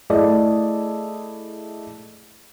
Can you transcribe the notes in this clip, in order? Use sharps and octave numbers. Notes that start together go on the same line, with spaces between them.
A3 E4 G#4 D5 D#5